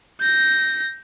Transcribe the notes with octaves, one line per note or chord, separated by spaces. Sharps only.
G6 A#6